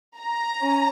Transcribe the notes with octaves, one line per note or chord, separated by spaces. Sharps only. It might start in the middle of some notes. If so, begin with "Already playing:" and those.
A#5
C#4